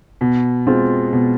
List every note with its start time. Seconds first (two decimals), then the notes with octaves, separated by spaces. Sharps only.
0.21 B2
0.67 G#3 C4 F4
1.13 B2